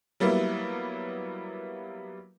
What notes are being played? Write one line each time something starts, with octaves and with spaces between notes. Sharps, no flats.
F#3 G3 A#3 B3 E4